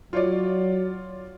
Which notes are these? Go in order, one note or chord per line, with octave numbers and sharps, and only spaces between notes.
F#3 F4 C#5 D5